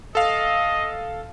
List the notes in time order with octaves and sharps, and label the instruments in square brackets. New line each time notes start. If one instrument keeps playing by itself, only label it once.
[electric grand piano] A4 F5 [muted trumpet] D#5